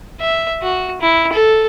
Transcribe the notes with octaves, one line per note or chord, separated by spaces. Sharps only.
E5
F#4
E4
A4